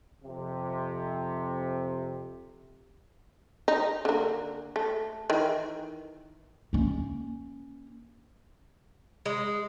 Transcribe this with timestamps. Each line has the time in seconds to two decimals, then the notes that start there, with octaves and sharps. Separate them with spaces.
0.24 F2 C3
3.68 D#4
4.05 D3 A#3
4.76 A3
5.30 D#3 E3
6.73 A#3 C#4
9.26 G#3